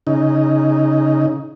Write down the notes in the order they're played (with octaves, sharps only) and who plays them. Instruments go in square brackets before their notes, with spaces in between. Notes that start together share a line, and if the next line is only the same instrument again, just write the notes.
[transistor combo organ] C#3 D#4